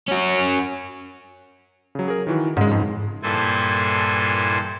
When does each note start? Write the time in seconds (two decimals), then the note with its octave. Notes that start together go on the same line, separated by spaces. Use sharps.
0.08 C#4 F#4
1.95 C#3 F#3
2.08 G#4 A#4
2.27 D#3 E3 F#4
2.57 G#2 C#3 G#3
2.71 F2
3.23 G2 A#2 E3 A4 C5 G#5